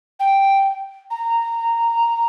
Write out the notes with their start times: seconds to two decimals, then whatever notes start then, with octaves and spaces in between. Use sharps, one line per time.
0.19 G5
1.10 A#5